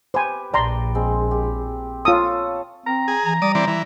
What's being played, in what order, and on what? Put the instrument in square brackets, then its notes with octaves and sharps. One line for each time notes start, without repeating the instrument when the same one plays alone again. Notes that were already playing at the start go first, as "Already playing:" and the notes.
[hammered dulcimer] G4 B4 [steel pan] C5 G#5
[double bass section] A#1 [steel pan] D5 A#5 C6 [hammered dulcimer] G5 A5
[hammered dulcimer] G#3 C4
G4
[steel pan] F4 D#6 [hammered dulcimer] A4 C#5 F5
[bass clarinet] C4 [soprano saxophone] A#5
[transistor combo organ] G#4
[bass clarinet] E3 [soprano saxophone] A#5
[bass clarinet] G3 [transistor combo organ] D5 D#6
[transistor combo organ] E3 C4 D5
E3